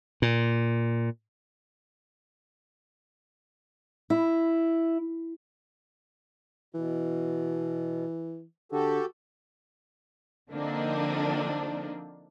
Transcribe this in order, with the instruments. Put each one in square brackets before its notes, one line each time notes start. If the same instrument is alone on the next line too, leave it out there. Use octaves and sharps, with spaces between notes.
[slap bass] A#2
[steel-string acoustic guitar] E4
[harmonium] B2 [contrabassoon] E3
[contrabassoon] D3 [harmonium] F#4 G4 A4
[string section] D3 F3 A#3 C4 D4 D#4